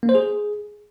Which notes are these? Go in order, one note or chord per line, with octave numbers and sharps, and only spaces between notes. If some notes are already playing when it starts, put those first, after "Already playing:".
A#3
C5
G#4